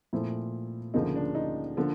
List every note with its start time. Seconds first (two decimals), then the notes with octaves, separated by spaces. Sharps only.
0.13 A#2 F3 A3 C4 E4
0.94 D2 C#3 F3 A#3 D#4
1.15 D4
1.35 D#4
1.77 D3 F3 A#3